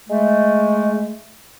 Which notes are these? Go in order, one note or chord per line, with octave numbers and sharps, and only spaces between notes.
G#3 A3